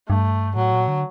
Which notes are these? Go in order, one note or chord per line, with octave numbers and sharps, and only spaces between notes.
G2 A3
A2 F#3
A#2
D3